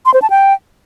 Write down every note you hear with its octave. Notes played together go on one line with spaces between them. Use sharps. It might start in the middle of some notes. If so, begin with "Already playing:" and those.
C6
C5
A5
G5